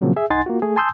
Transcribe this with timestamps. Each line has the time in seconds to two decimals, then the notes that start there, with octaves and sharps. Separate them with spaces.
0.01 A#2 C#3 F3 F#3 A#3 C4
0.16 G#4 E5
0.30 C2 D#4 F#5 G#5 C6 A6
0.46 A#3 F4 F#4
0.62 A3 G#4
0.76 G#5 A5 C6 D#6 E6 G6